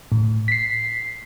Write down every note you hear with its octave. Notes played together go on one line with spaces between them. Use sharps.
A2
B6 C7